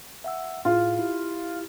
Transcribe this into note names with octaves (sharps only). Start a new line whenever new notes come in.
E5 F#5 E6
A2 E4 F4 G#4
E4 G4